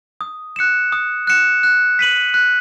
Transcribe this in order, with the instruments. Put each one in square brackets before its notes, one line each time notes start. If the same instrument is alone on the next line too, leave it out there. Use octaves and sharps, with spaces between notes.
[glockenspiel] D#6
F#6 C#7 E7
D#6
F#6 C#7 E7
F#6
B6 D#7 F#7
F#6